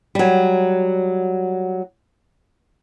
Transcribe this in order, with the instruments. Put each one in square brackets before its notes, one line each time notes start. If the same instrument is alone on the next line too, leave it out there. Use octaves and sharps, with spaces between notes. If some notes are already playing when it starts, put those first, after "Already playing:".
[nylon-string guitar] F#3 G3